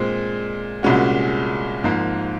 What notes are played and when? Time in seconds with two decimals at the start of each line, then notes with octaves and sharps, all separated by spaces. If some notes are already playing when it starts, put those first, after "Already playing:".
Already playing: A#2 G#3 C4
0.83 C2 A#2 G#3 C#4 F#4
1.83 G#1 G#2 F3 A#3